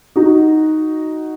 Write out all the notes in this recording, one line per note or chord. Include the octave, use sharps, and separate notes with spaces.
D#4 F#4